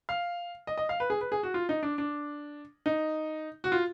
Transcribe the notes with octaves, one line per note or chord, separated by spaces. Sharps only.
F5
D#5
D#5
F5
B4
G#4
B4
G#4
F#4
F4
D#4
D4
D4
D#4
F#4
F4